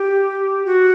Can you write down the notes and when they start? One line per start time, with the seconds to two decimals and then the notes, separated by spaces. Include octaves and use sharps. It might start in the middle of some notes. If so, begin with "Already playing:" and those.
Already playing: G4
0.66 F#4